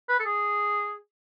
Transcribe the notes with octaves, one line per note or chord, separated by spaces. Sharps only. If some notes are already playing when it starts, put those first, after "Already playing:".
B4
A4
G#4